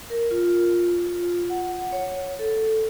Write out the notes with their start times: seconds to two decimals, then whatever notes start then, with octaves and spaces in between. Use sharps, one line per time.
0.10 A#4
0.31 F4
1.07 F4
1.50 F#5
1.92 C#5
2.39 A4